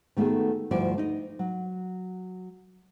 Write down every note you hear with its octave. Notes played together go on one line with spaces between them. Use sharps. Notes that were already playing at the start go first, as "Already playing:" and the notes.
D#3 A3 B3 F#4 G#4
D2 G2 F3 E4 F#4 D5
D#4 D#5
F#3